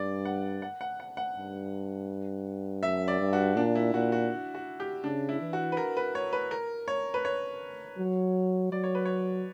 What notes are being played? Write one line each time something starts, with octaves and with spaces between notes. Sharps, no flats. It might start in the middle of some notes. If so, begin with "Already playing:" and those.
Already playing: G2 D5
F#5
F#5
F#5
F#5
F#5
G2
F#2 E5
D5
G2
F#4
A#2 D4
E4
A#2 F#4
F#4
F#4
G4
C#3 D4
E4
E3
F#4
B4
A#4
B4
C#5
B4
A#4
C#5
B4
C#5
F#3
F#3 D5
C#5
B4
C#5